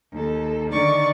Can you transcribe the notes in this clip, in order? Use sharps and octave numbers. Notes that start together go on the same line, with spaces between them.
D#2 A4
D3 D#3 D5 C#6 A6